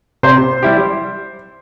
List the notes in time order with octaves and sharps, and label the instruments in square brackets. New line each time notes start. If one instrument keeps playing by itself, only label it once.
[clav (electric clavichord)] C3 [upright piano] C5
[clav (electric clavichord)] G3 E4 G4